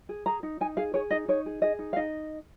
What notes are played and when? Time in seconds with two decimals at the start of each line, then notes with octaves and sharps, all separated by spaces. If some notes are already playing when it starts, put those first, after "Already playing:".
0.09 G#4
0.26 G#4 A#5
0.43 D#4
0.61 D#4 G#5
0.77 G#4 F5
0.94 G#4 C#5
1.11 D#4 D#5
1.28 D#4 C#5
1.46 G#4
1.62 G#4 D#5
1.79 D#4
1.93 F5
1.96 D#4 D#5